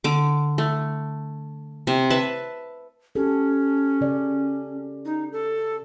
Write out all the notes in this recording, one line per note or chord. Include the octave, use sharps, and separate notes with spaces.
D3 D6
A3
C3
B4 E5 A5
C#4 G4 A4
C#3 D5
D#4
A4